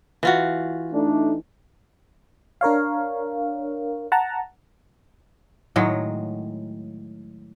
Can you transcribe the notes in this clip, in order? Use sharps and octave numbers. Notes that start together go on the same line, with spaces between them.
E3 F4 F#4
A3 D4 D#4
D4 A#4 C#5 F5
F#5 A5 A#5
A2 D#3 F#3 G#3